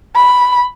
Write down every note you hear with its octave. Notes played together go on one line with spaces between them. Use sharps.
B5